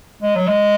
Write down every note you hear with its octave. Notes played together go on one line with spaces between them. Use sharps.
G#3
F#3
G#3